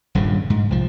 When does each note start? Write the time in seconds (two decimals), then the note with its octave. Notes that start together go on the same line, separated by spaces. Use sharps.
0.15 D#1 G2 A#2 C#3
0.50 G#2
0.71 C2 F3